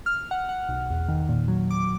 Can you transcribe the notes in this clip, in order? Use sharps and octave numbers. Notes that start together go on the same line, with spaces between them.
F6
F#5
F#5
B1
E2
D#3
A#2
F#3
D6